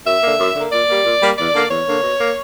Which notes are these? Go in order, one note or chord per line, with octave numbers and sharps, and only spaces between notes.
F#2 E5
D3 A#3
F#2
D3 A#3
A#2 D5
G3 A#3
A#2
G3 A#3
E2 D5
D3 A#3
E2 C#5
D3 A#3
B2
A#3